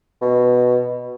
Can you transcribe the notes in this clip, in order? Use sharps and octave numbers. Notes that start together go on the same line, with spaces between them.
B2